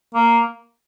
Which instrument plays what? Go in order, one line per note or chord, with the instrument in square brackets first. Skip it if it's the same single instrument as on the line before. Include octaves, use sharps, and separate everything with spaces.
[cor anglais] A#3